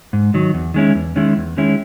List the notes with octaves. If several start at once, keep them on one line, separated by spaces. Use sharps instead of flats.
G#2
D#3 F#3
E2
D#3 G#3 C#4 E4
E2
D#3 G#3 C#4 E4
E2
D#3 G#3 C#4 E4